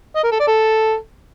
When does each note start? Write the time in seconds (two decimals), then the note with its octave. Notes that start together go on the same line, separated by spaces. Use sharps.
0.16 D#5
0.24 A#4
0.32 A4
0.40 D5
0.48 A4